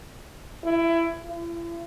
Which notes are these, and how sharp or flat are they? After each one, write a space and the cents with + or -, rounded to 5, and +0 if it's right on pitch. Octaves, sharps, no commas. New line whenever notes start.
E4 +20
E4 +40